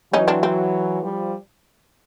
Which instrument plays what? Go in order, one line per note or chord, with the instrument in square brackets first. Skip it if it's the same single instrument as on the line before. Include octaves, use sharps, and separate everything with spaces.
[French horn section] E3 F#3 [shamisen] C#4 D#4
[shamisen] C4 D4
C4
[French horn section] F3 G3